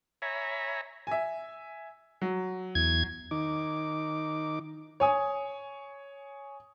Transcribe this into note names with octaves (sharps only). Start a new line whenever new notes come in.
C#5 E5 G#5 A#5 B5
E5 G#5
F#3
E2 G#6
D#3 D#4 D6
C#5 G#5 D#6